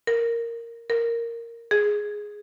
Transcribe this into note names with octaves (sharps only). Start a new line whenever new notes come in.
A#4
A#4
G#4